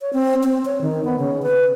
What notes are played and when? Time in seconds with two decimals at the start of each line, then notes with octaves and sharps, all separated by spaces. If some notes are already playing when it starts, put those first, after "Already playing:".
0.01 C#5
0.13 C4
0.43 C4
0.65 C#5
0.81 D#3
1.05 B3
1.18 C#3
1.43 B4